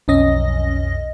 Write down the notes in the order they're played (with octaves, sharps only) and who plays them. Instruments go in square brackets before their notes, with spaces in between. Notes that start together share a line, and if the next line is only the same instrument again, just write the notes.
[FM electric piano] B1 F2 C#4 D#5 A#6